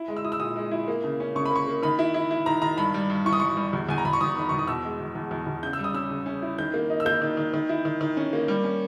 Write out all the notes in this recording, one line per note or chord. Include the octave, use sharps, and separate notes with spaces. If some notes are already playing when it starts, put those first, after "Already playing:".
Already playing: E4
G#3
E6
E4 D#6
E6
A#2 D#6
G#3
E4
A#3
C#3
C#4
C#3 C#6
B5
A#3 C#6
A#3
D#3 B5
E4
E4
E4
D#3 A#5
D#3 A#5
G2 B5
G3
G2
E3 C#6
D#6
G2 C#6
G3
E2
E2 G#5
A#5
E2 B5
C#6
E2 D#6
D#3 B5
E2 C#6
D#6
B2 E6
G#3
E2
E2
E2
E2
C#3 G6
E6
G3
D#6
C#4 E6
C#3
C#4
E4
D#3 G6
A#3
D#4
E6
A#3 G6
D#3
D#3
D#3
E4
D#3
D#3
C#4
A#3
G3
C#4